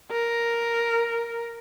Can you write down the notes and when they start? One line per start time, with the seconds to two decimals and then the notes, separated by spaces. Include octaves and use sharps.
0.11 A#4